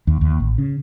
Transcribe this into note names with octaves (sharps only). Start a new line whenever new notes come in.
D#2
D#2
A1
C#3